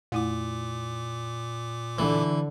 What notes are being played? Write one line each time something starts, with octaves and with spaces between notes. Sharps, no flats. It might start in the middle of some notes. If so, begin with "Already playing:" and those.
F2 A#2 A3 E4 D6
D3 E3